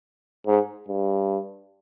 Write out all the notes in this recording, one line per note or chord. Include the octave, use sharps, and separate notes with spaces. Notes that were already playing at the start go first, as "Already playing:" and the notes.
G#2
G2